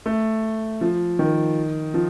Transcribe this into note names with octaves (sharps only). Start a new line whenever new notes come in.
A3
F3
D#3
F3